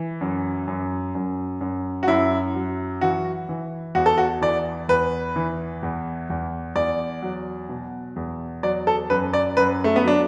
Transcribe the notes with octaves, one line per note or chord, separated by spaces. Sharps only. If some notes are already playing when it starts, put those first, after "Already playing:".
Already playing: E3
F#2
F#2
F#2
F#2
F#4
F#2 E4
F#3
E3 F#4
E3
E2 F#4
A4
F#4
E3 D5
E2 B4
E3
E2
E2
E2 D5
F#3
B2
E2
F#3 D5
A4
F#2 B4
D5
F#2 B4
A3
B3
F#3 D4